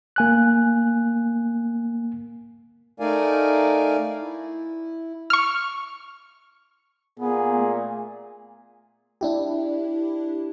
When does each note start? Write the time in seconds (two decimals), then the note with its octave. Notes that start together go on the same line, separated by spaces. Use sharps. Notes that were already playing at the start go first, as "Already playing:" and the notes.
0.16 A#3 G#5 F#6
3.00 A3 D#4 A#4 D5 F5 G#5
4.21 E4
5.30 C#6 F6
7.19 A#2 B3 G#4
7.56 A3
9.21 D4 E4 G4